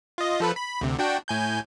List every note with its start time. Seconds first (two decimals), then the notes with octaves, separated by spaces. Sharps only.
0.18 F4 D#5
0.40 F3 A4 B4
0.56 B5
0.81 D2 C3
0.99 D4 F#4 G5
1.28 A2 G#5 G6